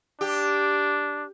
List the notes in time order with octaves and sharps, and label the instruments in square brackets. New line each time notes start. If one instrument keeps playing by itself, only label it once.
[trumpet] D4 [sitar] G4